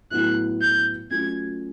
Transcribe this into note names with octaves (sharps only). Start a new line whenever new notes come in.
A2 F#3 B3 E4 F#6
G6
F#3 A3 C#4 F4 G#6